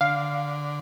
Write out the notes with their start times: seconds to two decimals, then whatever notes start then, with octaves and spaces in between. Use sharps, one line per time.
0.01 D3 F5